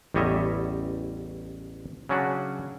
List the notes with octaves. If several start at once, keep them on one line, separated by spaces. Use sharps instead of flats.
A1 E2 G3 C#5 D#5 E5
C#3 F#3 C#4 D4 F#4